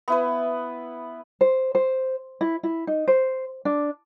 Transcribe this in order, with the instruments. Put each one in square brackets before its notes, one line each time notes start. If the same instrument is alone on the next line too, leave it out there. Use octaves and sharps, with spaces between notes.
[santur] B3 E4 B4
[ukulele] C5
C5
E4
E4
D#4
C5
D4